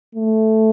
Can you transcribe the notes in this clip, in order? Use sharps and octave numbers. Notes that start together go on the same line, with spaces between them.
A3